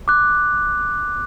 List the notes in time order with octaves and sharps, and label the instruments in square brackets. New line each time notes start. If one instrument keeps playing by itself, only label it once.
[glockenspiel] D6 F#6